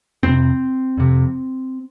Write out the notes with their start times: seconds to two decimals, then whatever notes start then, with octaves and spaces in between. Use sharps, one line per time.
0.23 F2 C3 C4
0.98 F2 C3